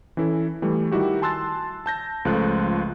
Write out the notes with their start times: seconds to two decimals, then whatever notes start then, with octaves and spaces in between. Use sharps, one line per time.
0.17 E3 C#4 E4 A4
0.62 E3 G3 A3
0.91 D#3 G3 E4 F#4 G4
1.22 G#5 A5 C6 E6 F#6 A6
1.86 A5 G6 A#6
2.25 C#2 F3 A3 F4 A4 F#6